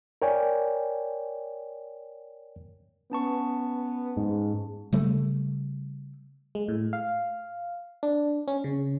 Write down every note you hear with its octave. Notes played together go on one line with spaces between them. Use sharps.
A#4 C#5 D5 G5 G#5
B3 C#4 A5 C#6
G#2
C#3 G3 A3
G#3
A2
F5
D4
C#4
C#3